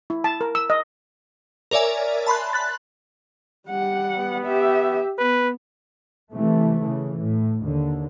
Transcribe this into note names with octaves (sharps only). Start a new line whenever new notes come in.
E4
A5
A#4
E6
D#5
A#4 C#5 D5 E5 G#5
A5 B5 C6 F#6
B5 F#6 A6
G3 F#5
B3
G4 E5
B3 B4
C3 E3 A3
C#3 E3
A2
D#2 D3